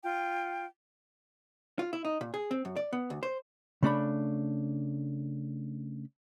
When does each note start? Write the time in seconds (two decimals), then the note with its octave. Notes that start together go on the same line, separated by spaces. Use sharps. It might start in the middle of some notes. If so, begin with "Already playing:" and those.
0.03 F4 G5
1.79 F4
1.93 E4
2.05 D#4
2.21 A#2
2.34 G#4
2.51 C4
2.65 F#2
2.76 D5
2.93 B3
3.10 D2
3.23 C5
3.83 C#3 A3 D4 B5